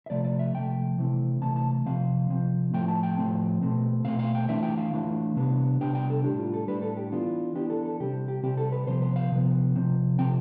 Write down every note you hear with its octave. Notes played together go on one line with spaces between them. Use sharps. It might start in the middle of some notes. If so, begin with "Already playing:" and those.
E5
C3 F3 A3 D5
D5
E5
C3 F3 A3 G5
C3 E3 A3 C4
C3 E3 A3 A5
A5
C3 F3 C4 F5
C3 F3 C4
A2 F3 A3 C4 G5
A5
G5
A2 F3 A3 C4
B2 A3 C4
B2 A3 C4 F5
F5
G5
E3 A3 D4 E5
G5
F5
E3 A3 D4
C3 G3 B3 D4
C3 G3 B3 D4 G5
G5
A4
A2 G3 D4 G4
F4
A4
A2 G3 D4 B4
A4
G4
E3 B3 D4 F4
E3 B3 D4 G4
A4
A4
C3 G3 C4 G4
G4
C3 G3 C4 G4
A4
B4
C3 F3 B3 C5
C5
F5
C3 F3 B3
C3 F3 C4
C3 F3 C4 G5